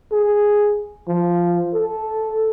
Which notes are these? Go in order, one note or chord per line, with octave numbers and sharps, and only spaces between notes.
G#4
F3
A4